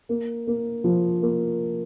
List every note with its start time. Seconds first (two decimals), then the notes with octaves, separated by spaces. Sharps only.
0.09 A#3
0.47 A#3
0.84 F3
1.22 A#3